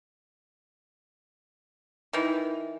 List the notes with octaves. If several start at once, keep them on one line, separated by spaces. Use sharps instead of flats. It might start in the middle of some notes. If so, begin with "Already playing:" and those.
D#3 E3